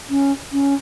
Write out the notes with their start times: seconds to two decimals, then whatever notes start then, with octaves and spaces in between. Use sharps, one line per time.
0.09 C#4
0.52 C#4